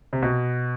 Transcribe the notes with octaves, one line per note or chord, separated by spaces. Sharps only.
C3
B2